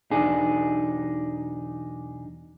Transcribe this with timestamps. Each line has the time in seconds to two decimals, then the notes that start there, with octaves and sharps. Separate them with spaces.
0.11 B1 E2 D4 D#4 G#4